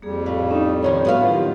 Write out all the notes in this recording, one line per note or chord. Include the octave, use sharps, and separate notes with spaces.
F2 G3 A#3 G#4
A2 F5
C#4 D#4
G2 D#3 F3 C#5
A2 B3 F#4 F5
D#3 F#3 F4 G4